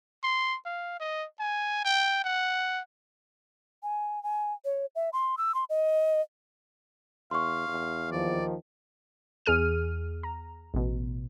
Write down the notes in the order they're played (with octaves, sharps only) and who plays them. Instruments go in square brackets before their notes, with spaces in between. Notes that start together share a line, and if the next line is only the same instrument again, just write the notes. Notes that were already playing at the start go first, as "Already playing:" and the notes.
[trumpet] C6
F5
D#5
G#5
G5
F#5
[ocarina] G#5
G#5
C#5
E5
C6
E6
C6
D#5
[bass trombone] E2 [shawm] F5 [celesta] C6 C#6
[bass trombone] E2
[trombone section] D#2 D#3 F3 [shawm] D5
[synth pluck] E2 G#4 F6 D#7
A#5
A1 B2